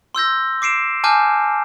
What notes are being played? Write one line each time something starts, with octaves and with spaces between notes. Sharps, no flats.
C6 E6 G6 A#6
D6 C7 D7 E7
G#5 A5 D6 F6 G6